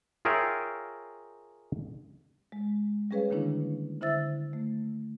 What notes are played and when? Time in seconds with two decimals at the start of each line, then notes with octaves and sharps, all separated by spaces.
0.25 F4 G#4 A#4 C#5 E5 G5
2.52 G#3
3.11 G3 C#4 G#4 B4 C#5 F5
3.30 D3 D#3 A#3 C#4 D4 E4
4.01 D3 E4 C5 E5 E6 A6
4.53 A3